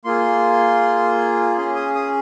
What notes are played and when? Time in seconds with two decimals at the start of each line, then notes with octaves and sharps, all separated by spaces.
0.04 A#3 F4 G#4 C6
1.57 C#4 G#4 C6
1.75 D#6
1.95 D#6